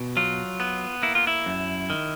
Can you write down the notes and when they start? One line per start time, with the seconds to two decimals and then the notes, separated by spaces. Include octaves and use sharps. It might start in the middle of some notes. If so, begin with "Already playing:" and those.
Already playing: B2
0.17 F#3 F4
0.60 B3
1.03 A#3 E4
1.15 F4
1.27 E4
1.46 F#2
1.90 D#3